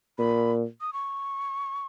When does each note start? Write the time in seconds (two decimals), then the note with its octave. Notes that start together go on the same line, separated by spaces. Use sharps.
0.18 A#2 B5
0.81 D#6
0.93 C#6